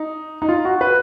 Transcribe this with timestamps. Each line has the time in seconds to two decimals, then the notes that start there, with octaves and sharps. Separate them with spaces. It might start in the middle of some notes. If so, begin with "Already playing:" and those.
Already playing: D#4
0.42 D#4
0.49 F4
0.65 F#4
0.81 B4